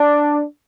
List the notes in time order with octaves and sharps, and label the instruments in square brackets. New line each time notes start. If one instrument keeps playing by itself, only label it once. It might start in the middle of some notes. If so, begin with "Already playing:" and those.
Already playing: [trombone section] D4